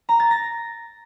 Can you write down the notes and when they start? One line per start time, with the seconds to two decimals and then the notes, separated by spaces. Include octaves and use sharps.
0.09 A#5
0.20 A6
0.31 A#6